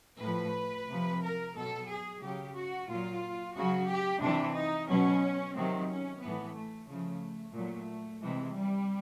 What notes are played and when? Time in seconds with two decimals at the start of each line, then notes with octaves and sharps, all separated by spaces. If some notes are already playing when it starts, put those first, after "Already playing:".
0.22 A2 F3 B4
0.89 C3 F3
1.23 A#4
1.56 B2 F#3 A4
1.90 G#4
2.22 C#3 F#3 G4
2.56 F#4
2.89 A#2 F#3 F4
3.55 C#3 F#3 F#4
3.89 G4
4.22 C3 E3 D4
4.56 D#4
4.89 B2 F#3 C#4
5.55 C3 D#3 F#3 C4
5.89 C#4
6.22 A2 E3 B3
6.55 A3
6.89 C#3 F3 A3
7.55 A#2 F#3 A3
8.22 C3 E3 G#3
8.55 G3